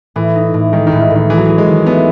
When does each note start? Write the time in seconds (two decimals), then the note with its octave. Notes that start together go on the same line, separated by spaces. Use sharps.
0.16 A2 E3
0.35 D#4
0.54 A2
0.73 D#3 G#3
0.87 D#3
0.92 A2 E3
1.01 D#3
1.10 A2
1.16 D#3
1.30 E3 G#4
1.38 F#3
1.46 E3
1.48 G#4
1.58 G#3
1.68 D#3
1.86 A3 B3